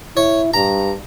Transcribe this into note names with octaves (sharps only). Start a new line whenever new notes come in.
E4 C#5
G2 A#5